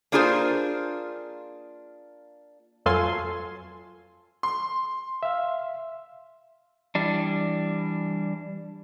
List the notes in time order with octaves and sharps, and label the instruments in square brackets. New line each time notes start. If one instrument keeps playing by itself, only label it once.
[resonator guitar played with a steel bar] A#3 D4 F4 G#4 A4 C5
[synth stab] F2 F#3 F4 A4 G#5 C6
[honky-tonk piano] C6
[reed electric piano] E5 F5
[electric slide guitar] E3 G3 D4